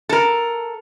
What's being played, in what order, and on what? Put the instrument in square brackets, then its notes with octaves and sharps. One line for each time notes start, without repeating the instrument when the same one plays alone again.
[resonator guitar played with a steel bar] A4 A#4